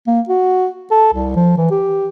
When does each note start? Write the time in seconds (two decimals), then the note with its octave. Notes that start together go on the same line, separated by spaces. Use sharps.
0.07 A#3
0.29 F#4
0.91 A4
1.14 C2
1.36 F3
1.57 E3
1.71 G4